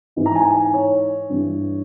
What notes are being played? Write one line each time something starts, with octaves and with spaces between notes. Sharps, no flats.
G#2 E3
A#5
G#5
G#5
C#5
G2 E3